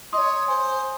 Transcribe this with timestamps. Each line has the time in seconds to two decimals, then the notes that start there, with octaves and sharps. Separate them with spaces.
0.13 C#5 D#5 C6 D#6
0.48 C5 G#5 C6